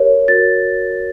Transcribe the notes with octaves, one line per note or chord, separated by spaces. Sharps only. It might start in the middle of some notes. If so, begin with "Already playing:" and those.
Already playing: G4 A#4 C#5
F#4 A#4 C#5 A6